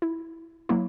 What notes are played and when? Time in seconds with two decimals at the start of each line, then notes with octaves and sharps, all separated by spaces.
0.02 E4
0.69 F#3 A#3 E4